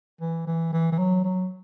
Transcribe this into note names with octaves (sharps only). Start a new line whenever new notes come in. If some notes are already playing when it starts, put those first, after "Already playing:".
E3
E3
E3
E3
F#3
F#3